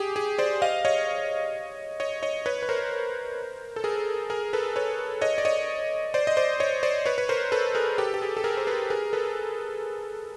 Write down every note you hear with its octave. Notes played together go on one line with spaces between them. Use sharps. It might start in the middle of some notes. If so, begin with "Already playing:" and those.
Already playing: G4 G#4
G#4
C5 D5
D#5 F5
C#5 D#5
C#5 D#5
C#5 D#5
B4 C#5
B4
A#4 C5
A4
G#4 A#4
G#4 A#4
A4 B4
B4 C#5
C#5 D#5
D5
C#5 D#5
C5 D5
D#5
C5 D5
C#5 D#5
C5 D5
B4 C#5
B4
A#4 C5
A4 B4
G#4 A#4
G4 A4
G4
G#4
A4
G#4 A#4
C5
A4 B4
G#4 A#4
A4 B4